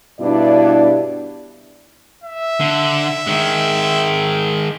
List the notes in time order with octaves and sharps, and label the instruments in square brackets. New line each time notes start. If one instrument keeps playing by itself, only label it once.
[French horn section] G2 B2 D4 E4 D5
[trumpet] E5
[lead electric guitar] D3
D#3 G#3